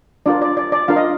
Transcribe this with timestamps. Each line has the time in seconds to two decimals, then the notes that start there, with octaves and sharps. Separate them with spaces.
0.26 D4 F4 A#4 D5
0.42 D5
0.57 D5
0.72 D5
0.88 D4 F4 A#4 F5
0.96 D#5